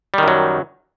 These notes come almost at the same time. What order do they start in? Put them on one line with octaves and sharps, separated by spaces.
G3 D#3 F#2 F#3